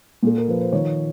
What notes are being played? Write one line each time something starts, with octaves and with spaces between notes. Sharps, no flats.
A#2 A4
A#4
F3 B4
C5
D#3 C#5